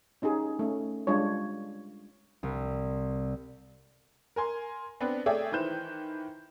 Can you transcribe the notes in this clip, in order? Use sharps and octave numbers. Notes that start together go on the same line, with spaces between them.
C#4 D#4 G4 G#4
A3 C#4
G3 G#3 D4 F4 C#5
C2
A#4 G#5 C6
B3 C4 D4 B4
A3 G#4 C#5 D5 E5 G5
D#3 E3 B4 C5 G6 E7